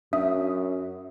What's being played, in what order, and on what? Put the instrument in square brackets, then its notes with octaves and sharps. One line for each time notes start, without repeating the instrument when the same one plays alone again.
[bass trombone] F#2 [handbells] D4 E5 D#6